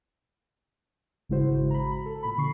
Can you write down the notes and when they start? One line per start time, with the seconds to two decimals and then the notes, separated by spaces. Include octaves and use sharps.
1.29 G#1 C#3 G#3 E4 F#4 C5
1.70 A#5 B5
2.06 A4
2.23 A#2 B5
2.38 D3 C#6 C7